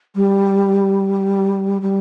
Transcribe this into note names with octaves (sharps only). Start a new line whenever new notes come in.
G3
G3